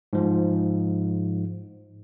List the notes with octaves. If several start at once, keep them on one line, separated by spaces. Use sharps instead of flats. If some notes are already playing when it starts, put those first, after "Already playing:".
G#2 F3